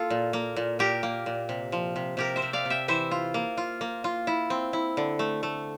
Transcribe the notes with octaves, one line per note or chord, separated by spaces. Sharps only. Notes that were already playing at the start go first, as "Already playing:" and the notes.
Already playing: A#3 F4 A4
A#2
A#3
A#2
A#2 G4 A#4
A#3
A#2
C3
F3
C3
C3 G4 A#4
C5 E5
C3
D5 F5
C3
E5 G5
E3 C5 E5
F4
A#3
F4
A#3
F4
E4
C4
E4
D3
A3
A3